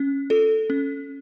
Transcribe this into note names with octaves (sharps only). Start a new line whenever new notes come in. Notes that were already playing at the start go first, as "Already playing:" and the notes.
Already playing: C#4
F4 A4
C#4